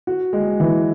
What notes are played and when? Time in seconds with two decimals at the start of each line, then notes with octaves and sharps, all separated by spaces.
0.07 F#4
0.33 G#3
0.60 E3